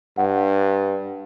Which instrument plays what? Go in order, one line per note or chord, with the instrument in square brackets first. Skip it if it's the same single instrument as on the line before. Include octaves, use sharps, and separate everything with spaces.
[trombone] G2 [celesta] F#5